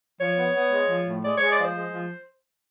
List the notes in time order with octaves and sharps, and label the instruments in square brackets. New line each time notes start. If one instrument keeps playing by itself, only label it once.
[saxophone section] F3 C#5
B3
B3
G#3
F3
A2
G#3 D5
G#3 C#5
D5
F3 C5
G#3
F3